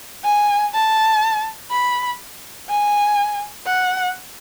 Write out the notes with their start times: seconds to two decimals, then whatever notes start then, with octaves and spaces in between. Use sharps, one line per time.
0.24 G#5
0.74 A5
1.71 B5
2.69 G#5
3.67 F#5